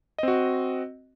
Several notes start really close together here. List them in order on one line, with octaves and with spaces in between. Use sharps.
D#5 C4 F#4